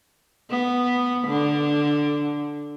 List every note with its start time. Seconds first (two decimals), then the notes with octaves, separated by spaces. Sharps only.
0.50 B3
1.28 D3